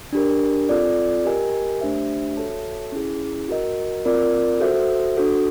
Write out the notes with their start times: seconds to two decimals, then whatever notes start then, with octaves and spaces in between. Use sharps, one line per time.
0.13 D4 G4 A#4
0.69 C4 F4 A4 D5
1.26 G4 A#4 D#5 G#5
1.81 A3 D4 G4 C5 E5
2.37 F#4 A4 C#5 E5 A5
2.92 C#4 E4 G#4
3.48 F#4 A#4 D#5
4.05 C4 F4 A#4 D5
4.60 F#4 A4 C5 E5
5.17 D4 F#4 A4